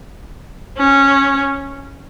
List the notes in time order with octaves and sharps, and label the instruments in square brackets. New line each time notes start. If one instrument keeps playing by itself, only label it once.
[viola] C#4